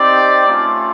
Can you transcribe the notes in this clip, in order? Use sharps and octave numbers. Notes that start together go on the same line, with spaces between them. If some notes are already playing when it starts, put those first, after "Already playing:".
Already playing: C4 D#4 G4 D5
A3 C#4 F4